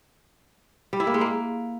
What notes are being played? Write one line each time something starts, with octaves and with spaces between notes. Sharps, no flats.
G3
E4
A#3
G#3
A#3